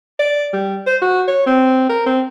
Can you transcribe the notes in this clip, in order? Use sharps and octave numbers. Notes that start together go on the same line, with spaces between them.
D5
G3
C5
F#4
C#5
C4
A#4
C4